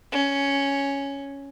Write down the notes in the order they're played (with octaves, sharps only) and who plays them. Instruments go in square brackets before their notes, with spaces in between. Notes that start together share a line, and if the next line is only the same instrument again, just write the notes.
[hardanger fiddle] C#4